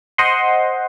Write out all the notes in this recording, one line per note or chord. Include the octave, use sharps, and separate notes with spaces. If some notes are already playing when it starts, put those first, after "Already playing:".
C5 D#5 F#5 C6